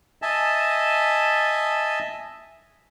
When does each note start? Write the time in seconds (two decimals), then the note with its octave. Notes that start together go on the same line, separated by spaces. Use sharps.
0.22 D#5 E5 G#5 A5